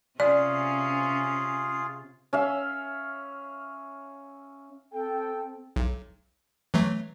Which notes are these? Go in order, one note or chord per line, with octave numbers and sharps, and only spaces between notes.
C3 C#4 F4 G#4 D5 F5
C#4 E5 F5
C4 A4 G5
B1
E3 F#3 A3